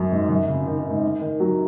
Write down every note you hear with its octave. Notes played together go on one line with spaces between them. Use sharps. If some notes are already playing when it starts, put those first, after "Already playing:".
Already playing: F#2
G#2
F#2
C#3
D#3
D#3
G#2
D#3
F#3